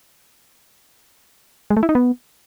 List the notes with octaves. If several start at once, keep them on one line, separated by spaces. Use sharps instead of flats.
G#3
A3
E4
D#4
B3